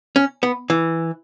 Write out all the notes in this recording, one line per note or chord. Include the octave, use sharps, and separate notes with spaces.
C#4
B3
E3